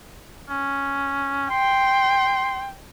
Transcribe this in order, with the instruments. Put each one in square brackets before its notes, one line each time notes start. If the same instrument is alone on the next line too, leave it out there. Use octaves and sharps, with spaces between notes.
[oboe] C#4
[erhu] G5 [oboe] C6